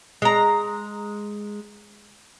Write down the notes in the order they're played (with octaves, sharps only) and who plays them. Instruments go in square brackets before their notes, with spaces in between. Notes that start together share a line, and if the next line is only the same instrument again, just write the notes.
[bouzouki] G#3 A#5